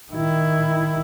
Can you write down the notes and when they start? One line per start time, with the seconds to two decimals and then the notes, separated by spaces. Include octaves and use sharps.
0.12 D#3 E4